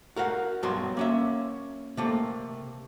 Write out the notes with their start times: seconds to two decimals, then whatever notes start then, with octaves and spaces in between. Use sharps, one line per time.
0.16 F#4 A#4 F5 F#5
0.63 G2 B2 F#3 F#4 C6
0.97 A#3 C#4 E5
1.97 C3 A3 A#3